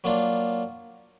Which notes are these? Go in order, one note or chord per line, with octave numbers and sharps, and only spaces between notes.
F#3 A#3 D4 F4